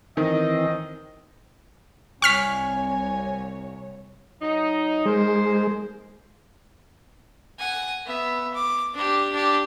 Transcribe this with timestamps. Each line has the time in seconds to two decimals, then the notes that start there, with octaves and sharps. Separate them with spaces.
0.17 D#3 E3 C4 D#5
2.22 C2 C#5 G#5 C#6 F6 B6
4.40 F#3 D#4
5.06 G#3 D#4 A#4 C5
7.58 F#5 G#5
8.06 B3 E5
8.54 D6
8.94 D4 G4
9.32 D4 G4